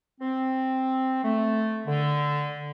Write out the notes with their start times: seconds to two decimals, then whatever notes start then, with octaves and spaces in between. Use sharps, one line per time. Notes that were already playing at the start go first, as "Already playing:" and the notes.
0.20 C4
1.24 A3
1.86 D3